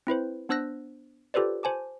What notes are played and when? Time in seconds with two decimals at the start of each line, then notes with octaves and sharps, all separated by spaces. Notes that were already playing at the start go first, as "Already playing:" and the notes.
0.07 C4 E4 B4 C5
0.49 B3 D4 C5 E6 F#6 A#6
1.34 F4 G4 A4 B4 C5 D5
1.63 C5 G#5 A5 D6